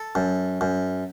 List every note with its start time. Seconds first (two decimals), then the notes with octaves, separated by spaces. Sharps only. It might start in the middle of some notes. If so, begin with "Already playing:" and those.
Already playing: A4
0.15 F#2
0.61 F#2